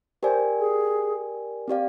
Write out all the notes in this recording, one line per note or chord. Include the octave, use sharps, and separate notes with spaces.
G4 A#4 C5 D5 G#5
G#4
C4 G4 D5 F5